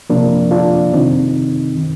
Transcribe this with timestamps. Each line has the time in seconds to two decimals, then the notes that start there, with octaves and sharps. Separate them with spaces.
0.10 C3 F3 A#3 D4
0.51 D4 F4
0.93 C3 D#3 C4 D#4
1.77 D#3